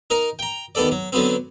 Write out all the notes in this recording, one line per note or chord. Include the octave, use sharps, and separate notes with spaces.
D#4 A#4 A#5
G5 A#5
D#2 B3 A4 D5
F#3
D3 F#3 B3 C4